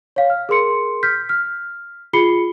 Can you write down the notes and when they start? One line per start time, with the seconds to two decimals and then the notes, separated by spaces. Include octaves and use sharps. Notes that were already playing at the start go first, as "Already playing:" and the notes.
0.16 C#5 F5
0.30 F6
0.49 G#4 A#4 C6 C#7
1.03 F6 G6 B6
1.29 F6
2.13 F4 G#4 B5 C7 C#7 G7